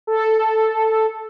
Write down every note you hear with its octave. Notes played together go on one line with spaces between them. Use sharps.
A4